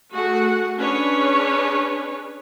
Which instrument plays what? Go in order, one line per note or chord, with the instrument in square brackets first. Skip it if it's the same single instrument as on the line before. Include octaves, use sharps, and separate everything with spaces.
[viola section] A3 F#4 G#4 F#5
C#4 D4 G#4 B4 C#5